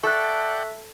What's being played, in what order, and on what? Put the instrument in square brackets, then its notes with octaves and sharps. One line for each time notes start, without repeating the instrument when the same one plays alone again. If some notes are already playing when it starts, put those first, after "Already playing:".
[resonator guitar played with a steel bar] A4 [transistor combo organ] D5 F#5 G5 [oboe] E5 [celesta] C#6 F#6